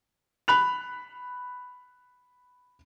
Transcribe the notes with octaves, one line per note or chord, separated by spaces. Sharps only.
B5 F#6 F7